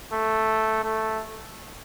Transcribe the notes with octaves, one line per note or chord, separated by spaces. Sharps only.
A3
A3